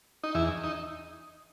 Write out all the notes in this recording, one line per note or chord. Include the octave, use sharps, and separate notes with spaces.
D#4
E2 E4
D#4